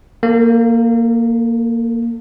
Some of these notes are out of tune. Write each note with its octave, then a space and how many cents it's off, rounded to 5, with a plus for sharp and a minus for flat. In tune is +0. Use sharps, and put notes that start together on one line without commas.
A#3 -5 A4 +35